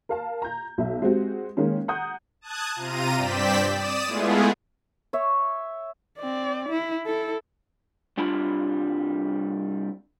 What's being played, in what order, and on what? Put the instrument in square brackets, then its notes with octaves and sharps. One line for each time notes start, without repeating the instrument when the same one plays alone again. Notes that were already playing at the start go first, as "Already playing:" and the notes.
[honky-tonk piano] A#4 F5 A5
A#5 G6
B1 E5
G#3 C4 F#4 G4
D#3 G#3 A#3 C#4
F#5 A#5 D#6 G6
[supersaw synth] A5 D#6 F#6 G#6
C3 F4 A#5 D#7
G2 C4 D5 G5 B6 E7
D5 D#6 E7
G#3 A3 B3 E4 F4 G#4
[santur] C#5 E5
[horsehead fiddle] C4 D5
E4
E4 A4
[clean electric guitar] C2 G3 D4 F4 B5